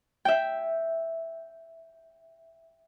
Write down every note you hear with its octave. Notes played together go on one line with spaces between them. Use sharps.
E5 G5